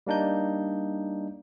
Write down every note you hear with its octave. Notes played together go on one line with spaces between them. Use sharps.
G3 A#3 D4 D#4 G6